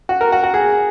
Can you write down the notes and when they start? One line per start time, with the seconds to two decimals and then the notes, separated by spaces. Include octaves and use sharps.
0.09 F#4
0.21 A#4
0.32 F#4
0.44 F#4
0.54 G#4